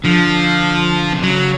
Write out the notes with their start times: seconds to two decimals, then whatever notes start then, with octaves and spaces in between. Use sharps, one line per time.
0.04 D3 F3
1.12 C3
1.23 C#3 F#3